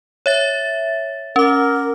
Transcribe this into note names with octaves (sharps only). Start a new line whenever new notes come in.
C#5 E5 A6
C#4 A#4 D6